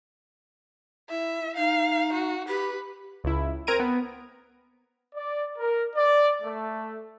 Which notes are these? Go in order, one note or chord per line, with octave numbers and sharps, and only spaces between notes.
E4 E5
D#4 F5
F#4
G4 B4
C#2 E4
C4 A#4 A#5 G#6 D7 D#7
B3
D5
A#4
D5
A3